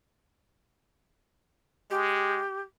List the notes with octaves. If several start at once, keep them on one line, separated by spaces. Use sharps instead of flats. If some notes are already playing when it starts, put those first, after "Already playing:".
G#3 G4